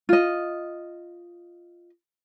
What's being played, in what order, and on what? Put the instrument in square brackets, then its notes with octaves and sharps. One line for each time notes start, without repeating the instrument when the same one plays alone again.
[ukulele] F4 D#5